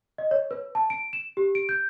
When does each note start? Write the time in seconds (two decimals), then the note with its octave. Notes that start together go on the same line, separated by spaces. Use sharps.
0.18 D#5
0.31 C#5
0.51 B4
0.75 A5
0.90 D7
1.13 E7
1.37 G4
1.55 D7
1.69 G6